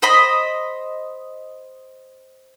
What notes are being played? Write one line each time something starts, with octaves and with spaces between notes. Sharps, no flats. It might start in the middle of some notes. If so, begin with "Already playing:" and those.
C5 D#5 B5